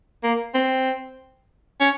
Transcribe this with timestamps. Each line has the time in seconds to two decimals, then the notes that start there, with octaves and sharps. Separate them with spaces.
0.24 A#3
0.54 C4
1.80 C#4